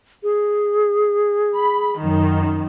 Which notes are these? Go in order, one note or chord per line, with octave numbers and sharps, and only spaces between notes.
G#4
B5
F#2 D#3